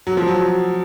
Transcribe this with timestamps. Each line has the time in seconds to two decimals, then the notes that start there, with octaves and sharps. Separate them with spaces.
0.07 F#3
0.17 F3
0.28 F#3